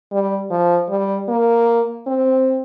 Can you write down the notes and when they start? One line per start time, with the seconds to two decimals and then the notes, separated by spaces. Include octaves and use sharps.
0.12 G3
0.51 F3
0.90 G3
1.28 A#3
2.06 C4